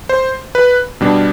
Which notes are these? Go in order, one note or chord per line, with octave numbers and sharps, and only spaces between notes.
C5
B4
B2 G3 D4